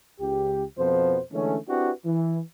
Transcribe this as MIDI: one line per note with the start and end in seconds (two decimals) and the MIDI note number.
0.20 0.63 37
0.20 0.63 67
0.78 1.20 41
0.78 1.20 47
0.78 1.20 53
0.78 1.20 59
0.78 1.20 72
1.33 1.57 50
1.33 1.57 52
1.33 1.57 56
1.33 1.57 57
1.33 1.57 61
1.68 1.91 60
1.68 1.91 62
1.68 1.91 64
1.68 1.91 66
1.68 1.91 67
1.68 1.91 71
2.05 2.40 52